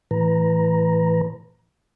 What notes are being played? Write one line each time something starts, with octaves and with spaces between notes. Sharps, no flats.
A2 E3 B4 A#5